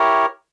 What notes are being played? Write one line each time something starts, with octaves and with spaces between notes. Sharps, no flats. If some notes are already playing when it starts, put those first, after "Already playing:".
Already playing: E4 G4 A#4 C#5